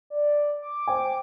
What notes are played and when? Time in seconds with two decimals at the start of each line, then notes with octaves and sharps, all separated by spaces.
0.10 D5
0.62 D6
0.87 C5 G5 G#5 D6